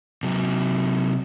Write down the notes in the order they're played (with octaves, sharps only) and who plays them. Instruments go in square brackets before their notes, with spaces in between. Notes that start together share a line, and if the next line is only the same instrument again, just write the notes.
[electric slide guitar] C3 F#3